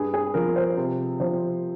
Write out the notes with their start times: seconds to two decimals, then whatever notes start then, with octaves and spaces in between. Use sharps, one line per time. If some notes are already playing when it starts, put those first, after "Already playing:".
Already playing: G2 G#4
0.14 G#4
0.34 F3 A#4
0.56 C5
0.77 C3
1.20 F3 C5